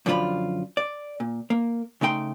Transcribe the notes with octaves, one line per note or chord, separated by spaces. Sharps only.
F#2 D3 F3 F4 D5 B5
D5
A#2
A#3
C#3 A3 D#4 G5 C6